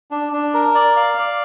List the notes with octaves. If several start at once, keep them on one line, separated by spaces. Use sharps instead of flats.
D4
D4
A#4
D5
F5
D5